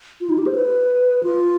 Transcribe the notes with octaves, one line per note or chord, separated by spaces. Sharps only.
F4
D#4
G4
C5
B4
F4